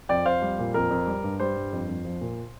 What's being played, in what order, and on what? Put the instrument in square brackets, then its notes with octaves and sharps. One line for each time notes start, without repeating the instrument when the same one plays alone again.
[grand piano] F2 D5 G5
F2 C5 F5
G3
A#2
F2 A#4
F2
G3
G2
G3 C5
G2
F2
F2
F3
A#2